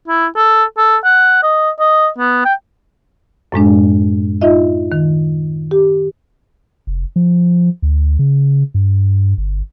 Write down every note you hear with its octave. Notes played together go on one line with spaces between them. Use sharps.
E4
A4
A4
F#5
D#5
D#5
B3
G5
F#2 A2 G#3 D4
D#4 F4 D#5 E5
D#3
G4
F1
F3
D2
C#3
G2
G1